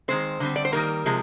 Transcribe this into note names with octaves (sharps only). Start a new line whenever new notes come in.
D#3 G#3 C4 C5
D3 G3 C4
D5
C5
D#3 G3 A#3 A#4
C3 F3 G#3